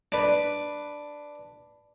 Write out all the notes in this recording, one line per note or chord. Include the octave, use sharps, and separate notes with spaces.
D4 B4